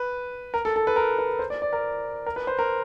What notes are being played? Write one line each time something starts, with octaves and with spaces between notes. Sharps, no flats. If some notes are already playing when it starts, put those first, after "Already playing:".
Already playing: B4
A#4
A4
A4
B4
A#4
B4
C5
D5
D5
A#4
A#4
B4
C5
A#4